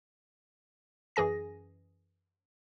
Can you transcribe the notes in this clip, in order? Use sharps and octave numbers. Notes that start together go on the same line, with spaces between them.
F#2 E3 G#4 G#5 A#6